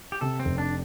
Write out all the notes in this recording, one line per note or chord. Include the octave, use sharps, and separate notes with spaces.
G4
C3 A4
C4
F1
D4